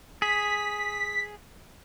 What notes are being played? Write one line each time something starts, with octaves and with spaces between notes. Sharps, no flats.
G#4 B6